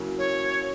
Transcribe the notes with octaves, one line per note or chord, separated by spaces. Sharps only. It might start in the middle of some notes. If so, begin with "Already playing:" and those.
Already playing: C#3 F#3 A#3 C#4 E4
C#5